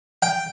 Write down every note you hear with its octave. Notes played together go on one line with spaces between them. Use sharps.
G5